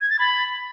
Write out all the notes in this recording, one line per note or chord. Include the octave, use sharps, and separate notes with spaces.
G#6
A6
B5